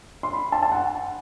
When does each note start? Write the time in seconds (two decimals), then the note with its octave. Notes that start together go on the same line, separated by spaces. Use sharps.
0.23 C6
0.33 B5
0.52 A5
0.62 A5
0.72 F#5